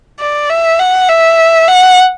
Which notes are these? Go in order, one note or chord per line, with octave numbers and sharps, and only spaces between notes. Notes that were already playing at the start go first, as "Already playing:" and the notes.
D5
E5
F#5
E5
F#5